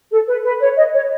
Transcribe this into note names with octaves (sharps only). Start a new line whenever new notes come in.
A4
B4
B4
C#5
D#5
C#5